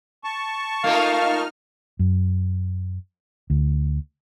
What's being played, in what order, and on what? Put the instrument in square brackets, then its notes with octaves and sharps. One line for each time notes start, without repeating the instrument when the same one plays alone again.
[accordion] A5 C#6
[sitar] A3 A#3 F4 [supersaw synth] D#4 F6 [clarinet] F5
[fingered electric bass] F#2
D2